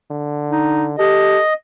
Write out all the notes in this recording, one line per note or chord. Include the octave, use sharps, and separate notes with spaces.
D3
D#4
G4 A4 D#5